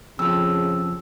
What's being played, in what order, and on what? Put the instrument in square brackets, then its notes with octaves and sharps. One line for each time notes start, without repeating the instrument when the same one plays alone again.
[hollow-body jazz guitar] F2 F3 [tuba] C#3 [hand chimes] E6